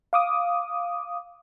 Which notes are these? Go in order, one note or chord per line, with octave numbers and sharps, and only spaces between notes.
F5 D6 D#6